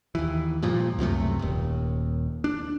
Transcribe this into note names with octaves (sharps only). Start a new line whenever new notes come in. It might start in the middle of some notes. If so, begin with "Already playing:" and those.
D#2 E3
G2 A#2 F3
C#2 F#2 C3 A3
D#1 D#2
D4